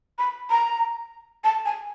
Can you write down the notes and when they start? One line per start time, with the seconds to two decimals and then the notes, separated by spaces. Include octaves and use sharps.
0.18 B5
0.50 A#5
1.44 A5
1.65 G#5